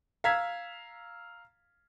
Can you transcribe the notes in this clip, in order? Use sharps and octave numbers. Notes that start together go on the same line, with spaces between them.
F5 A#5 E6 G#6 B6